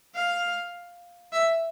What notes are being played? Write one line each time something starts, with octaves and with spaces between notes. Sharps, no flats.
F5
E5